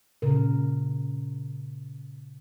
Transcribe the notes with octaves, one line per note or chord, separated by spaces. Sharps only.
A#2 C#3 A#4